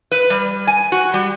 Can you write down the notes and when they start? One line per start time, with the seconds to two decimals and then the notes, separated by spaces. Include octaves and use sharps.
0.12 B4
0.30 G3
0.67 G#5
0.92 F#4
1.14 G3